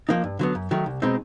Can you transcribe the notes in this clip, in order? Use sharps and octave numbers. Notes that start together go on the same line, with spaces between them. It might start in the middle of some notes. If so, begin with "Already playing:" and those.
F3 A#3 D#4
G2
D3 F#3 B3
F#2
D#3 F#3 A3
C2
B2 G#3 C4 D#4